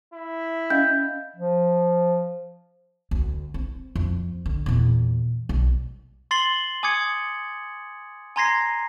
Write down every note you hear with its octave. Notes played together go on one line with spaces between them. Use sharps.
E4
C#4 D#5 F5 G6
F3
D2
C4
F2
D3
E2 A#2
B1 G3
C6 A6 C7 F#7 G7
G#5 D6 D#6 G#6 C#7
G#5 A#5 C6 G#6 A#6 C7